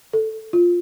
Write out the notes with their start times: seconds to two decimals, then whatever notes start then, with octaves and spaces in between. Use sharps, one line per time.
0.13 A4
0.53 F4